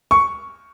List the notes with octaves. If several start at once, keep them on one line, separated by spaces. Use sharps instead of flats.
C#6